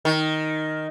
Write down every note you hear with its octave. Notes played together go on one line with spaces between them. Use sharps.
D#3